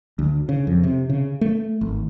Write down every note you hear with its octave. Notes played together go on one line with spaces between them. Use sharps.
D2
C#3
F2
C3
C#3
A3
G#1